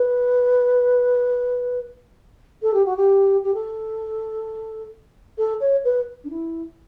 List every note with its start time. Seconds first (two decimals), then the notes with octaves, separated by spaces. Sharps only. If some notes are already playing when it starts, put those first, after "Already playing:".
Already playing: B4
2.62 A4
2.74 G4
2.85 F#4
2.96 G4
3.44 G4
3.54 A4
5.38 A4
5.60 C#5
5.84 B4
6.24 D4
6.30 E4